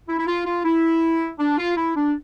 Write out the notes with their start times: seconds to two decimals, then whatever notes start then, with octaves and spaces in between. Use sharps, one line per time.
0.08 E4
0.19 E4
0.27 F4
0.46 F4
0.64 E4
1.39 D4
1.58 F4
1.76 E4
1.95 D4